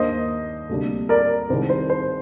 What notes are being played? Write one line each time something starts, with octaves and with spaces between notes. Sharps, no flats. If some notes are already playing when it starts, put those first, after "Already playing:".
Already playing: D#2 D#3 A#3 D4 C5 D#5
D2 C3 G3 A#3 D4
A#4 D5
C2 C3 D#3 G#3 C5
C5
C5